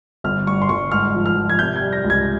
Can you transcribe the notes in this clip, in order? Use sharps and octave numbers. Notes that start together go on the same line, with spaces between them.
G1 F6
G2 C#6
C6
G1 C#6
G#2 F6
F3
F6
F3
G#6
C3 G6
G#6
G3
A#6
C#2
G#6